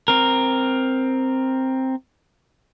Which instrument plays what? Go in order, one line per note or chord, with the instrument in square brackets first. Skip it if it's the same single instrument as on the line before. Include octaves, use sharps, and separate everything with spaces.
[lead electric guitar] C4 A#4